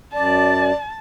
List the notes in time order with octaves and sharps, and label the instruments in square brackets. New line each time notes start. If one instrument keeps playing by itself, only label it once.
[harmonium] F#2 [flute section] D5 [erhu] A5